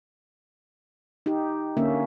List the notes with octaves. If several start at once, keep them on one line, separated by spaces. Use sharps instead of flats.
D#4 G4
D3 A#3 C#4 E5